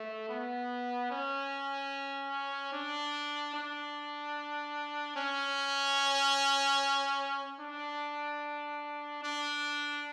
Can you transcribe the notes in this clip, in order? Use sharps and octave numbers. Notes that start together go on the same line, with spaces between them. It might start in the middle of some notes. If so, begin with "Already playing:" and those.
Already playing: A3
B3
C#4
D4
D4
C#4
D4
D4